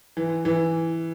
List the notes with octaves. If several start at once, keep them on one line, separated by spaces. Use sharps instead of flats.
E3
E3